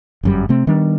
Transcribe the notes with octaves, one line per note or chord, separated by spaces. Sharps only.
G1 F#2 G3
C3 A3 C4
D#3 G3 B3 D4